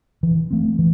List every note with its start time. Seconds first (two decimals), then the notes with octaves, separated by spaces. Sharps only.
0.23 E3
0.51 A3 C4
0.79 E3